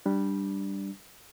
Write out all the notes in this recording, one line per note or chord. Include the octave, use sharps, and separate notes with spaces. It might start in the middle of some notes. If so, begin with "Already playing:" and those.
G3 D4